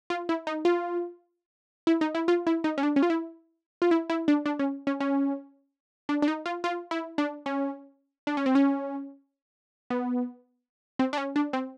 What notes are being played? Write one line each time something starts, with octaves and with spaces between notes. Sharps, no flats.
F4
E4
D#4
F4
E4
D#4
E4
F4
E4
D#4
C#4
D4
C#4
F4
E4
F4
E4
E4
D4
D4
C#4
C#4
C#4
D4
D4
D#4
F4
F4
E4
D4
C#4
D4
C#4
C4
C#4
B3
C4
D4
C#4
D4
C4